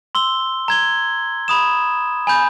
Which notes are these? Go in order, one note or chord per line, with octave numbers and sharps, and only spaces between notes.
C6 E6 G7
A#5 G#6 G7
B5 D#6 E7
G#5 B5 G6